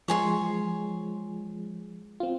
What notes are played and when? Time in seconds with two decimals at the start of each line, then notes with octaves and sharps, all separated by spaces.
0.08 F3 G#3 C#5 G#5 C6
2.20 C4 F4